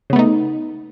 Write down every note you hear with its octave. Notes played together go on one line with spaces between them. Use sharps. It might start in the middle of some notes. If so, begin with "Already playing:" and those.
C#3 A3 B3 D#4